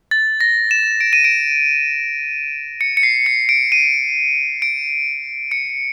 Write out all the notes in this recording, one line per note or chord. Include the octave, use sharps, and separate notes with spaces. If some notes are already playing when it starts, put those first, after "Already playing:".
A6
A#6
E7
D7
D#7
D7
C#7
C#7
C7
C#7
D7
D#7
D7
C#7